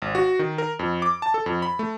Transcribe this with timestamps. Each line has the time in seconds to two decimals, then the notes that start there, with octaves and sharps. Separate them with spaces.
0.02 G#1
0.15 F#4
0.39 D#3
0.58 A#4
0.79 F2
1.02 D6
1.22 A5
1.34 A4
1.46 F2
1.62 B5
1.79 A3